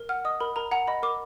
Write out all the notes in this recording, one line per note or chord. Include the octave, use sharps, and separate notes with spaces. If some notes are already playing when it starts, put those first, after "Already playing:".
Already playing: A#4
F#5 F6
D#5 D#6
A#4 B5
A#4 A#5
F#5 A#5
D#5 B5
A#4 D6